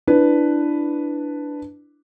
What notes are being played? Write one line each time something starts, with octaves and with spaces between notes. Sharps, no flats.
D4 E4 B4